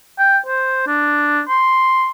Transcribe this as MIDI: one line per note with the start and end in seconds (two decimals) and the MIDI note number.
0.18 0.38 79
0.46 0.84 72
0.87 1.41 62
1.49 2.11 84